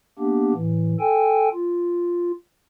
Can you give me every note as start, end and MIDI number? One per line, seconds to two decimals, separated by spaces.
0.19 0.53 58
0.19 0.53 59
0.19 0.53 62
0.19 0.53 67
0.54 0.96 45
0.54 0.96 52
1.00 1.49 69
1.00 1.49 79
1.00 1.49 80
1.54 2.32 65